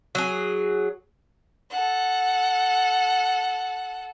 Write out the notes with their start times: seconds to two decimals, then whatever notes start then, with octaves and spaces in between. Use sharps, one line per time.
0.15 F#3 G#4
1.71 A4 F#5